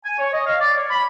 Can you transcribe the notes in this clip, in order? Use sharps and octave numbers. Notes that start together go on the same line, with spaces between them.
G#5
C#5
D#5
F5
D5
C#5
B5